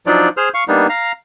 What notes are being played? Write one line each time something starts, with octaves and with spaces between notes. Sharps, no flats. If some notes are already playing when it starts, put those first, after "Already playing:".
F3 F#3 D4 D#4 F4 D5
G#4 C5 F6
F5 C#6
G3 A#3 B3 D4 D#4
F5 A#5